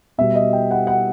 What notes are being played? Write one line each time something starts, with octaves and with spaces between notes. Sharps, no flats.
B2 G3 E5
D#5
G5
F#5
F#5